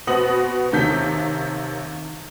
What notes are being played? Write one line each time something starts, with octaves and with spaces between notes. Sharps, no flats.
B2 B3 C4 D#6 A#6 F#7
D#2 C3 D#3 G6 B6